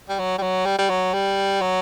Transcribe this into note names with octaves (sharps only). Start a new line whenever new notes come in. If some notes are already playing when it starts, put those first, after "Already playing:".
G3
F#3
G3
F#3
G3
G3
F#3
G3
F#3